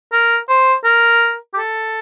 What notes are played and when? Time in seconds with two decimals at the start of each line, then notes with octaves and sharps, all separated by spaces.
0.13 A#4
0.49 C5
0.85 A#4
1.54 G4
1.58 A4